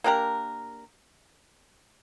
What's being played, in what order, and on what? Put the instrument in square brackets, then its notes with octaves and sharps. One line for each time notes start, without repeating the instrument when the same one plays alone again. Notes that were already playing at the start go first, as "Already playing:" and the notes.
[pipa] A#3 D4 G4 A#4